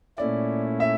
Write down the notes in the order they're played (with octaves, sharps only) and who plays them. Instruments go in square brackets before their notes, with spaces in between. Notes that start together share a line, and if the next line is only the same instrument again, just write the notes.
[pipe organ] A#2 A3 C#4 E4 [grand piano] D5
[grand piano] E5